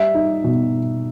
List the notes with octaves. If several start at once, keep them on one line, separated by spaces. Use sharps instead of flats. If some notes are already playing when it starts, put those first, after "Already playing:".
Already playing: G3 E5
D#4
B2